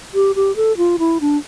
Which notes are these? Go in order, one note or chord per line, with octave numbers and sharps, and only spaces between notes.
G4
G4
A4
F4
E4
D4